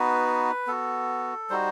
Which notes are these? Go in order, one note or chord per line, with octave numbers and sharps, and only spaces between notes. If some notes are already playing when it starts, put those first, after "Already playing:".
Already playing: B3 D#4 F#4 B4
B3 F#4 A4
G3 D#4 F#4 C5